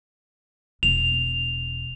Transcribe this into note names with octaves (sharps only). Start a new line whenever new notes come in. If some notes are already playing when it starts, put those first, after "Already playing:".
E1 F7